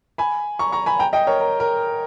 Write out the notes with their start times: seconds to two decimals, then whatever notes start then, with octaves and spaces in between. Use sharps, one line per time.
0.18 G#5 B5
0.59 A#5 C#6
0.72 A#5 C#6
0.86 G#5 B5
0.99 G5 A#5
1.13 D#5 G5
1.27 A#4 C#5
1.41 A#4
1.60 A#4